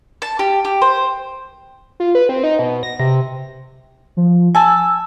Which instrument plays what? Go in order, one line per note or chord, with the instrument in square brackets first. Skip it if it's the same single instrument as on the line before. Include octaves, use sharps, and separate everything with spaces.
[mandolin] A5
G4
G4
C5
[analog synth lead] F4
B4
C4
D#4
B2
A#6
C3
[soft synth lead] F3
[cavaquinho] G#5 A5 [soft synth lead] E6